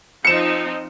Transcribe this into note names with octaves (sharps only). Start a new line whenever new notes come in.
F3 C4 D#4 C#7 E7